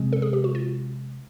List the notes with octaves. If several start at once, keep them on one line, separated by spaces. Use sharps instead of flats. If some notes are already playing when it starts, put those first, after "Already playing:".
Already playing: C3 F3 G#3 C4 C#4
A4
G#4
G4
F#4
F4